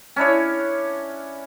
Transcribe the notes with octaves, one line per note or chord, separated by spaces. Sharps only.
C#4 D4 E4 C#5